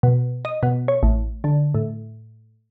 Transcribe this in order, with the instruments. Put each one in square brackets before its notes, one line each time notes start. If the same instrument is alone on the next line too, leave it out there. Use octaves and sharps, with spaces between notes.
[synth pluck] B2
D#5
B2
C#5
A1
D3
A2